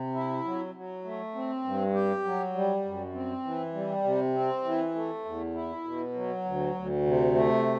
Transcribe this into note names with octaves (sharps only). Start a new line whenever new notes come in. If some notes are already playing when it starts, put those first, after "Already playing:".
Already playing: C3
E4
F#3
F#3
A3
C4
G2
G4
F#3
G3
F#2
C4
E3
G3
C3
C4
E3
A3
E2
E4
B2
F#3
D2
D2
C3
A3